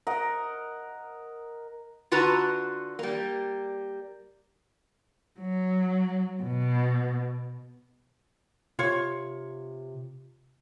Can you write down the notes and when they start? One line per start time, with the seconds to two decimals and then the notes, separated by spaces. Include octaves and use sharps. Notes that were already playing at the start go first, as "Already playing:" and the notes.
0.07 A#4 D#5 F#5
2.12 D3 F4 F#4 B4 A5 A#5
2.99 G3 A#3
5.40 F#3
6.43 B2
8.79 C3 F4 C#5